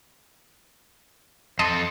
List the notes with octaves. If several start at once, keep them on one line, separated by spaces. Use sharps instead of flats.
F2 A4 D#5 A5 C6